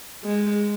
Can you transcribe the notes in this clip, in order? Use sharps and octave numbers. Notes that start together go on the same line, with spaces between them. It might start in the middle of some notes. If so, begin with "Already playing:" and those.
G#3